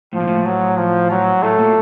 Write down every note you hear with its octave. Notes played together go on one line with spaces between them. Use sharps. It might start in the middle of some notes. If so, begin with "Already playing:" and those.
A2 F3
A#2
A2
F#3
F3
F#3
A2 A3
A#2